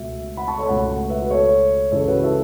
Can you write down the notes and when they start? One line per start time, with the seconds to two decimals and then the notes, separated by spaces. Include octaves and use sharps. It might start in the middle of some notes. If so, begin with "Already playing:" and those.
Already playing: C#2 B2 A3 E5
0.37 F#5 B5
0.48 A5 C#6
0.58 A4 C#5
0.68 C#2 B2 A3 F#5 B5
1.09 B4 E5
1.20 F#4 B4
1.30 A4 C#5
1.92 C#2 C#3 E3 A4 C#5
2.08 F#4 B4
2.23 E4 A4